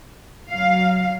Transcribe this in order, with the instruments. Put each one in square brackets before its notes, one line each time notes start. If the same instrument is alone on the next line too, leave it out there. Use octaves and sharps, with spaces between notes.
[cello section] F#3 F5